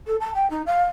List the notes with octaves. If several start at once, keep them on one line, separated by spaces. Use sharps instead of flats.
A4
A5
G5
D#4
F5